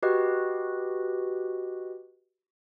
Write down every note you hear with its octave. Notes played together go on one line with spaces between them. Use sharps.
F#4 G4 B4 D#5